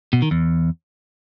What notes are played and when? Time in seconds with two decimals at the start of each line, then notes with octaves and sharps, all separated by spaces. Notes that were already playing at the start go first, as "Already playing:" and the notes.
0.13 B2
0.22 D#3
0.31 E2